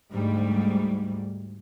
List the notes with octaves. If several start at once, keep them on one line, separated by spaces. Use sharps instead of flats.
D2 G#2 G3